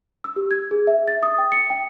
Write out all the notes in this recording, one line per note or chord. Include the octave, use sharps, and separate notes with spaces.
E6
G4
G#6
G#4
E5
A6
D#6
G5
C#7
G5